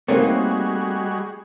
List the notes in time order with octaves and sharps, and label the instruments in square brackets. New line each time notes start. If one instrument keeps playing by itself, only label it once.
[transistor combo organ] G3 F#4 G#4 [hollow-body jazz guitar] A3 C4 D#4 [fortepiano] A#3 C#5